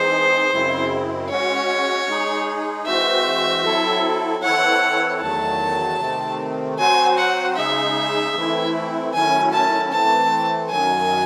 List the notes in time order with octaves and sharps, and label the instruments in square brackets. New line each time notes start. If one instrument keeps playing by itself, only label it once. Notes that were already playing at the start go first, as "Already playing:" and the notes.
Already playing: [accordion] E3 G#3 C4 D#4 G#4 [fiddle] C5
[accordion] F#2 C#3 G#3 C4 E4
[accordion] G#3 C#4 F#4 [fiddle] C#5
[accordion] G#3 D#4 G#4
[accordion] E3 G#3 C4 F#4 C5 [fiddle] E5
[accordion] F#3 C4 E4 A4
[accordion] E3 C4 E4 A4 C#5 [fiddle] F#5
[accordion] E2 D#3 F#3 A3 [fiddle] A5
[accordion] C3 D#3 A3 C4
[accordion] F#3 C4 F#4 C5 [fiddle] G#5
[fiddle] F#5
[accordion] C#3 G#3 D#4 G#4 [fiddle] E5
[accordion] E3 A3 C4 E4
[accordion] D#3 F#3 A3 C#4 E4 [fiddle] G#5
[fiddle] A5
[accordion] E3 A3 C4 [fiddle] A5
[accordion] F#2 D#3 F#3 [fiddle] G#5